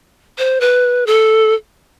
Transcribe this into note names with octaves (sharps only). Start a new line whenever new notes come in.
C5
B4
A4